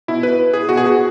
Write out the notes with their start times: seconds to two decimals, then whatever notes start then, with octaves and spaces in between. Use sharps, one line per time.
0.08 B2 E4
0.23 B4
0.54 G#4
0.69 B2 F#4
0.77 G#4
0.86 F#4